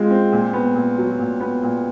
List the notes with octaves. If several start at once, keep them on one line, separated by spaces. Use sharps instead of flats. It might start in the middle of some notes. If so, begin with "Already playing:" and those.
Already playing: G#3 C4 F4
C4
A#2
B3
A#2
F#3
A#2
B3
A#2